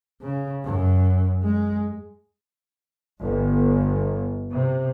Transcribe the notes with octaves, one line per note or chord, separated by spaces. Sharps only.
C#3
F#2
G#3
G1
C3